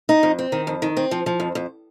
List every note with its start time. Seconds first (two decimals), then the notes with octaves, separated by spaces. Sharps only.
0.09 D#4
0.23 F2
0.39 C4
0.52 D#3
0.67 F2
0.82 D#3
0.97 C4
1.11 F3
1.26 F3
1.40 F2
1.55 F2